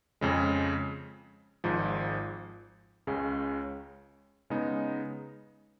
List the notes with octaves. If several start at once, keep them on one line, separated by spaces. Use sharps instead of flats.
F2 C#3 G#3
G#1 G#2 F3
C#2 C#3 G#3 C#4
C#3 G#3 B3 D#4